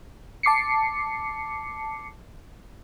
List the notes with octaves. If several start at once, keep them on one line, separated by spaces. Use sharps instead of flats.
A5 D6 C7 C#7